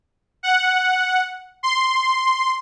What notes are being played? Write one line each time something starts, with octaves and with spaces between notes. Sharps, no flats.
F#5
C6